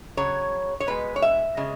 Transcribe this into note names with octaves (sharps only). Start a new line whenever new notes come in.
C#3 F#3 C#5
C#5
B2 G#3 B4
C#5
E5
C#3 G#3